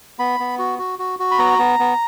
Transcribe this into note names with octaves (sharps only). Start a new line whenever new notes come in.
B3 B5
B3
F#4
F#4
F#4
F#4
B5
B3 A#5
B3
B3